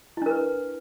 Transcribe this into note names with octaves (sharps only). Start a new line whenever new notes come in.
D4 E4 A#4 B4